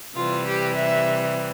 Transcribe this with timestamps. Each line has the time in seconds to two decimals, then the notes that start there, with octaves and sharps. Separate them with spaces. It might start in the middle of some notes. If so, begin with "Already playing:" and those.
0.16 C3 E3 G3 F4
0.46 G4
0.74 E5